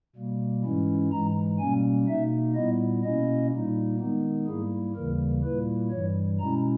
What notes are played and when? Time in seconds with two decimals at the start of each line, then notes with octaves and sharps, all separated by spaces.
0.16 B2 G3 A#3
0.64 G#2 E3 G#3 C#4 E4
1.11 G#2 E3 G#3 A#5
1.59 B2 G3 A#3 C#4 G#5
2.07 B2 A#3 D#4 E5
2.55 A#2 G3 B3 E4 D#5
3.04 B2 A#3 C#4 E4 D#5
3.52 A#2 G3 A#3 D#4
3.99 D#3 G#3 B3 D#4
4.47 G#2 G3 A#3 E4 G#4
4.95 D#2 C#3 E3 G3 A#3 A#4
5.43 A#2 G3 A#3 E4 B4
5.91 G2 E3 G3 C#5
6.39 B2 G#3 C#4 E4 A#5